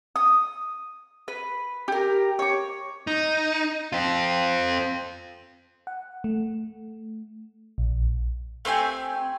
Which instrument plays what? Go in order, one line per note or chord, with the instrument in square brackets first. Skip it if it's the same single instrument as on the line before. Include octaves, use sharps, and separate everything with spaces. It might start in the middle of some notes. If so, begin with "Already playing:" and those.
[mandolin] D#6
B4
G4 A#4
C#5 D6
[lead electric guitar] D#4
C4 F4
[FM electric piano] F#5
A3
A#1
[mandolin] A3 C4 G4 G#5